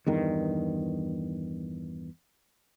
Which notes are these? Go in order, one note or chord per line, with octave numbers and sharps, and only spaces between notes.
E2 G2 D#3